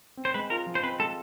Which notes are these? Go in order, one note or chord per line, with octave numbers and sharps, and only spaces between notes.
C4
C5
G#3 B4
F4 A#4
F3
C5
C4 B4
G#3 A4